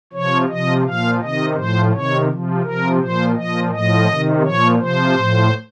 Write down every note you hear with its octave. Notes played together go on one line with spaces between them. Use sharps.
C3 F3 C#5
C3 F3 D#5
A#2 F3 F5
C3 D#3 D#5
A2 F3 C5
C3 D#3 C#5
C3 F3
C3 F3 A#4
A#2 F3 C5
A#2 F3 D#5
A2 F3 D#5
C3 D#3
A#2 F3 C#5
C3 F3 C5
A2 F3